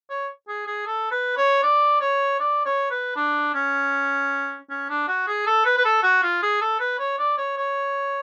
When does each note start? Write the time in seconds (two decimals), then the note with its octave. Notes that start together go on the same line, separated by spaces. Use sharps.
0.10 C#5
0.48 G#4
0.66 G#4
0.86 A4
1.11 B4
1.37 C#5
1.63 D5
2.01 C#5
2.39 D5
2.65 C#5
2.90 B4
3.16 D4
3.54 C#4
4.70 C#4
4.89 D4
5.08 F#4
5.27 G#4
5.47 A4
5.65 B4
5.78 B4
5.85 A4
6.03 F#4
6.23 F4
6.42 G#4
6.61 A4
6.80 B4
6.99 C#5
7.18 D5
7.38 C#5
7.57 C#5